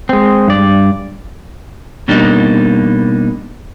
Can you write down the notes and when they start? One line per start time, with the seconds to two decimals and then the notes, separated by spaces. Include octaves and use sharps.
0.09 G#3 C4
0.48 G2 D5
2.08 B2 G3 A#3 D4 D#4 G4